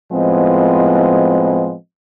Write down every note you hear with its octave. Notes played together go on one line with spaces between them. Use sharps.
A2 F3 G#3 B3 C4 D#5